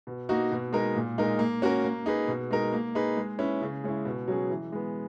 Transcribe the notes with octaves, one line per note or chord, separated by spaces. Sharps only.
B2
A#3 D#4 F#4
B2
G#3 D#4 A#4
A#2
G#3 D#4 A#4
A#3
C#4 F#4 A#4
A#3
D#4 G#4 B4
B2
G#3 D#4 A#4
A#3
D#4 G#4 B4
G#3
C#4 E4 B4
C#3
G#3 C#4 E4
B2
F#3 C#4 G#4
E3
G#3 B3